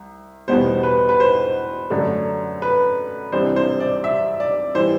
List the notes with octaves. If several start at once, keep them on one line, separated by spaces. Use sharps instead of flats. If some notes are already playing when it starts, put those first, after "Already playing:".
Already playing: C2
E2 B2 G3 B3 C5
B4
B4
C5
F#2 D3 A3 D4
B4
C2 C3 E3 G3 D4 C5
C5
D5
E5
D5
E3 G3 C5